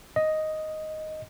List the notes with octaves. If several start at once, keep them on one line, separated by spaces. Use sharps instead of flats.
D#5